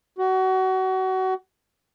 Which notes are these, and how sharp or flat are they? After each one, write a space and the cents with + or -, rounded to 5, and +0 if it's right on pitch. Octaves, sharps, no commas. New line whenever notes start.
F#4 +25